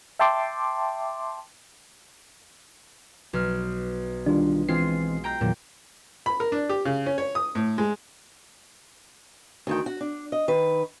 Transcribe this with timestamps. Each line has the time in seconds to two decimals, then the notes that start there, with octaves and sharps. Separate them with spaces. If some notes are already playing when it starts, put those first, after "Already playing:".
0.19 E5 G5 A5 C6 D6
3.33 B1 F6
4.26 D#3 G3 D4 F4
4.69 E3 G#3 C4 F4 C7
5.24 G5 A#5 G6
5.41 E2 A#2 D#3 F#3
6.26 B5
6.40 A#4
6.52 D4
6.69 G4
6.85 C#3
7.06 C#4
7.18 C#5
7.35 D#6
7.55 A2
7.78 G#3
9.67 D2 D#3 G5
9.86 F#4
10.01 D4
10.32 D#5
10.48 D#3 B4